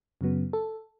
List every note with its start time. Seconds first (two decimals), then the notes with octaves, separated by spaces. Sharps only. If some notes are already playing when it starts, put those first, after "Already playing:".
0.21 F#2 C#3 F#3 B3
0.53 A4